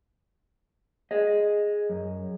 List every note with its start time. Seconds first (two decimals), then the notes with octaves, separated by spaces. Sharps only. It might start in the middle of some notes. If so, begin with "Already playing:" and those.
1.11 G#4 D#5
1.90 F#2